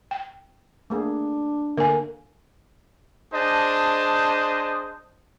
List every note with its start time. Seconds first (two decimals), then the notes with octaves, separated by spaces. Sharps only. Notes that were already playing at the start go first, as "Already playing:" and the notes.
0.11 G5
0.90 A3 A#3 D4 G#4
1.77 D3 A#3 A#4 G#5
3.33 D4 G#4 C5 D#5 A5